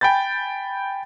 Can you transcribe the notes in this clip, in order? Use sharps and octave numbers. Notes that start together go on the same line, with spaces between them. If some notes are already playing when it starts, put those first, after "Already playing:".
G5 G#5 B5 G6 A6